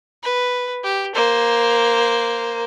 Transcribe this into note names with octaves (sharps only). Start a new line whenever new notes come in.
B4
G4
A#3 C5